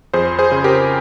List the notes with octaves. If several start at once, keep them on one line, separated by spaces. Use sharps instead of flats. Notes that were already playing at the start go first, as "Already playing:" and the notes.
F2 G#4 C5
G#4 C5
C#3
G4 A#4